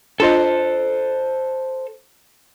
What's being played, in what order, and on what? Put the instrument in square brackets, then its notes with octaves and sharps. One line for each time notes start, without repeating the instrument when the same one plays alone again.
[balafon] D4 F4 D#5 [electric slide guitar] A4 C5